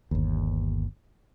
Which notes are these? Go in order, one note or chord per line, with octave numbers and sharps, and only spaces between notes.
G1 D#2